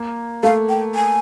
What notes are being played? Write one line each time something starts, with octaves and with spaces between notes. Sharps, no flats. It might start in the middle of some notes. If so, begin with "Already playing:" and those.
Already playing: A#3
A3 F5
G5
G#5